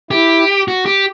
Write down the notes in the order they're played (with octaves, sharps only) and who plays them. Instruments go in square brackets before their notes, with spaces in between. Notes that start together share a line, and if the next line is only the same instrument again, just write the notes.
[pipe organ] E4 [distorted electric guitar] G4
[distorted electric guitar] F#4
G4